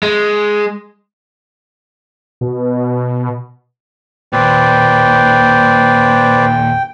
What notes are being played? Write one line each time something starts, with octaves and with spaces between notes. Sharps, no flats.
G#3
B2
D#2 A#2 B4 C5 D5 G5